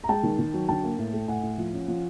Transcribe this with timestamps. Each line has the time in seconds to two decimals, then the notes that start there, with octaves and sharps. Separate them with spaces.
0.04 A#5
0.09 G#3 G5 A5
0.23 D#3
0.39 D#3
0.54 F#3
0.68 D3 G5 A5
0.83 A#3
0.98 A2
1.13 A3
1.28 A2 F#5 G#5
1.43 A2
1.58 F3
1.73 C#4
1.88 F3